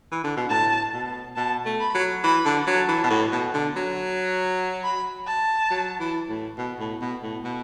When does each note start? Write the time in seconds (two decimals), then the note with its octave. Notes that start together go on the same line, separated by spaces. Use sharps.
0.12 E3
0.24 D3
0.37 B2
0.50 A2 A5
0.93 B2
1.36 B2 A5
1.66 A3
1.80 B5
1.95 F#3
2.24 E3 B5
2.45 D3
2.67 F#3 A5
2.89 E3
3.04 B2
3.10 A2
3.32 B2
3.54 D3
3.76 F#3
4.84 B5
5.27 A5
5.71 F#3
6.00 E3
6.29 A2
6.58 B2
6.80 A2
7.01 B2
7.23 A2
7.44 B2